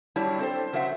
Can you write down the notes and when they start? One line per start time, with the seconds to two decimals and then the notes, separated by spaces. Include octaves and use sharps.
0.16 F#3 G3 D4 E4 G4 C#5
0.38 C4 A4 C5
0.73 C#3 F#3 C5 E5 F#5